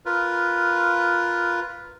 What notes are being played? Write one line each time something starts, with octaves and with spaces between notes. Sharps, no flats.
F4 A#4 B4